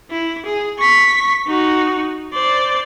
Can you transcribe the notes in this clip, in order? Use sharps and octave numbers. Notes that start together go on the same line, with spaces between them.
E4
G#4
C#6 B6
D#4 F#4
C5 D5